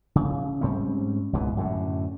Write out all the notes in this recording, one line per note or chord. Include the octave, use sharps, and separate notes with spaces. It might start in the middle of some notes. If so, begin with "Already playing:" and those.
C#3
G#2 G3 C4 C#4
C#2 G#2 B2 E3
F#2 A2 D3